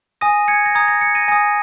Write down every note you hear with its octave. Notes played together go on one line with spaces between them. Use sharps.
G#5 D#6 A#6 D#7
G#6 C#7
A#6
A#5 D#6 G#6
A#6
G#6 C#7
A#6 D#7
G#5 D#6 A#6